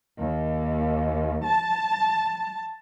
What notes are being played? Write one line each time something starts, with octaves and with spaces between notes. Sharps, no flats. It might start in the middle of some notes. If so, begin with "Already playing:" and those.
D#2
A5